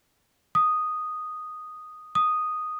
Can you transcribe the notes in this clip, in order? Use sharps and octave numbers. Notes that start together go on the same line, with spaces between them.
D#6
D#6